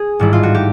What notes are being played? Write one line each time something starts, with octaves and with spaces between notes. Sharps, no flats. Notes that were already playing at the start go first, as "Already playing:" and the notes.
Already playing: G#4
A1 G#2 D#3 G3 E4
F4
F#4
G4